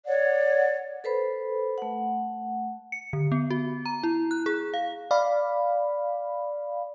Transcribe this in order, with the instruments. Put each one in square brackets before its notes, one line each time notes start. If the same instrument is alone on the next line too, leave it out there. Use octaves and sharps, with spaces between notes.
[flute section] C#5 D5 F#5
[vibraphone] A4 B4 C5 B5
A3 F#5
[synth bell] C#7
D3
B3
F#4
A#5
E4
F#6
G#4
F5
[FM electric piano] D5 F5 B5